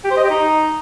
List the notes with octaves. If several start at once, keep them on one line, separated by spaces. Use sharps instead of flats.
G4
C5
D#5
G4
D#4